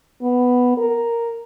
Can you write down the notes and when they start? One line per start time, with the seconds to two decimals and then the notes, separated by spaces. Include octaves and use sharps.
0.22 B3
0.78 A#4